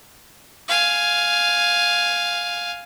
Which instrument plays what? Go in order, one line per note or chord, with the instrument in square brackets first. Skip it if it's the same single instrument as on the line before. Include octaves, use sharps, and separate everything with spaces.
[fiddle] F5 G#5